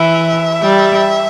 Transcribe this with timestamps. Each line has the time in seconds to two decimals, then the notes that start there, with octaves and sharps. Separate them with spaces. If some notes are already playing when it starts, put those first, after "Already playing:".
Already playing: E3 E5
0.62 G3